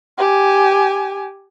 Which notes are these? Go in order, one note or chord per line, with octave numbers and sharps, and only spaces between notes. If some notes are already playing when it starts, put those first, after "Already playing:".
G4 G#5